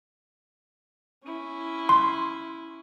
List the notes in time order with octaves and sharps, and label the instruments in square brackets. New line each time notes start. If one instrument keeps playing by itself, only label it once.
[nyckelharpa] C#4 E4
[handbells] C6